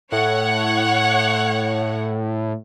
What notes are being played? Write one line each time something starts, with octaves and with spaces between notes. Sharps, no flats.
A2 C#5 F#5